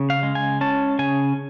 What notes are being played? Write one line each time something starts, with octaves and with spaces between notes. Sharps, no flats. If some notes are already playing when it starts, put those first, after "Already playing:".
Already playing: C#3
F5
G#3
G#5
C#4 A5
C#3 G#5